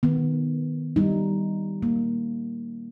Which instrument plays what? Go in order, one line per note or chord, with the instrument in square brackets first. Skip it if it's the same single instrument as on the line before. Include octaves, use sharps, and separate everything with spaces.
[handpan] D#3 B3
G3 D#4
A#3